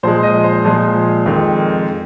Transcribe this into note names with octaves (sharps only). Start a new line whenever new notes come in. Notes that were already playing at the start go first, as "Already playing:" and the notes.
A#2 F3 G#3 C5
D#5
C5
A#2 F3 G#3
F2 D#3 G#3